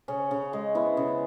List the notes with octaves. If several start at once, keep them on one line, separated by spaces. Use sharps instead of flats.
C#3 C#4
C#3
G#3
B3 E4
C#3